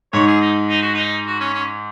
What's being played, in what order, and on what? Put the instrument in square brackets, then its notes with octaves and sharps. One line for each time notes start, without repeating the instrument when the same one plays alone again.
[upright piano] G#2 [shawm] C#5
[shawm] G#4
D#4
D#4
F#4
D#4
F#4
C#4
C#4